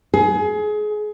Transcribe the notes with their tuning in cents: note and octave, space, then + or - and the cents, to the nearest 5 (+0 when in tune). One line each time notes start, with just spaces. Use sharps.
G#4 +25